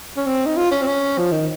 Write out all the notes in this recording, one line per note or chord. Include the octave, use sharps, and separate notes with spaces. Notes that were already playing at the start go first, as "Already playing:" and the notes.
C#4
C4
D#4
F4
C#4
C4
C#4
F3
D#3